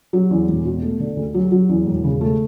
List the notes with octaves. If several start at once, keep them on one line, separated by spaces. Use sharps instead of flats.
F#3
E2
E1
B2
A3
D3
D2
F#3
F#3
E2
E1
C#3
A3